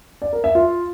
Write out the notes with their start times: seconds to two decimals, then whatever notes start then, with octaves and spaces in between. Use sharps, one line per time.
0.22 D5
0.33 A#4
0.44 E5
0.55 F4